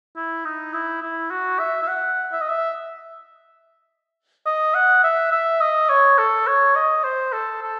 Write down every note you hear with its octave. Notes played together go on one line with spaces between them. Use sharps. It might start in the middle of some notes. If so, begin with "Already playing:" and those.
E4
D#4
E4
E4
F#4
E5
E5
F#5
E5
D#5
E5
D#5
F#5
E5
E5
D#5
C#5
A4
C#5
D#5
C5
A4
A4